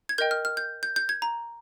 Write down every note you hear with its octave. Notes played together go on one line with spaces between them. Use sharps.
G#6
A#4 D#5 G5 G6
F6
F6
G6
G6
G6
G#6
A#5